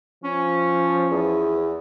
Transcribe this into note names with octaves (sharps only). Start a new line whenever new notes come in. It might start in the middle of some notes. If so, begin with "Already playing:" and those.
F3 C#4
E2